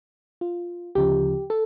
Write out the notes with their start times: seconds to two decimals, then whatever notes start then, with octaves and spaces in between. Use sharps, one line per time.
0.41 F4
0.95 D2 C#3 F3 G4
1.50 A4